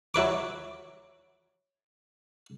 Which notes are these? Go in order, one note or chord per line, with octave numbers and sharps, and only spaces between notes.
F#3 E4 B4 D6